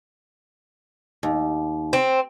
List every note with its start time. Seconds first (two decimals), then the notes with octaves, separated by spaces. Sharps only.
1.23 D#2
1.93 C4